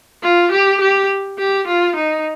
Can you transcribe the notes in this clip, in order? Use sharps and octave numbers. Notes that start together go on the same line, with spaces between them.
F4
G4
G4
G4
F4
D#4